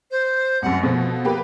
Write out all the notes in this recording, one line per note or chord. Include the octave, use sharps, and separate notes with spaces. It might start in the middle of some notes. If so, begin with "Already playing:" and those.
C5
C2 F#2 F#5
B2 F3 A4
A#3 G4 B4